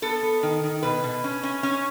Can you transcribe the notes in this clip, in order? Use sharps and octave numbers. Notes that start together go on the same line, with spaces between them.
B3 A4
B3
D#3
D#3
B2 B4
B2
C#4
C#4
C#4